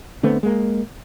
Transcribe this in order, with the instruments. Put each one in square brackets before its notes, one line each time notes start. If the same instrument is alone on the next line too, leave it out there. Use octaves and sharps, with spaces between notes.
[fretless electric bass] D3 A3 B3 C4
G#3 A#3